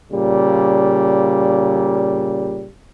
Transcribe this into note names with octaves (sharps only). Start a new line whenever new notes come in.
A#2 C#3 G3